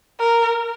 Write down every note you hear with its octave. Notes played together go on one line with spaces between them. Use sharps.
A#4